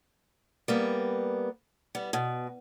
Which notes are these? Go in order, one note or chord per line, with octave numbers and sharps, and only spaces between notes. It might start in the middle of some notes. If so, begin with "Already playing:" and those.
G3 A#3 B3
G3 B3
B2